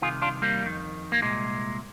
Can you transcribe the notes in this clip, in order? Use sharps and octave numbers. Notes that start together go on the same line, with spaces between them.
C2 C3 D#3 F4 G#4
D4 F4
G3 A#3
F2 D#3
A#3
C2 A#2 G#3